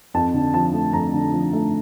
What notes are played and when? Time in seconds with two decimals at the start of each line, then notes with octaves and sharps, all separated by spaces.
0.14 F2 A5
0.34 D3
0.54 F3 A5
0.73 A3
0.93 F2 A#5
1.13 D3
1.32 F3
1.53 A3